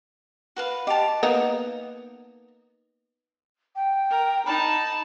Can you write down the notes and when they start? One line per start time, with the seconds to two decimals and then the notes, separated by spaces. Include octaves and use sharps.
0.56 F#4 B4 F5
0.87 G4 D#5 G5 A5 F7
1.23 A#3 B3 D#4
3.76 G5
4.10 A#4
4.46 D#4 A5 B5